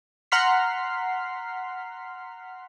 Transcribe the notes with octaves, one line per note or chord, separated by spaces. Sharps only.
F#5 A#5 C6 F6 B6 C7